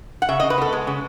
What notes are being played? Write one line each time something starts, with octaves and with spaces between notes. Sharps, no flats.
F#5
C#3 E5
C#3 D#5
B4
B3 A4
G#3
C#3